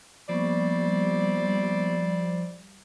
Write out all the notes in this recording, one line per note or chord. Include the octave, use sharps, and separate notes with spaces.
F3 G3 A#3 B3 E4 C5 D5 C#6